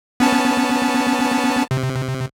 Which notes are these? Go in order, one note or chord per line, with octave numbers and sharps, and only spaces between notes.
B3 C#4 A5
C3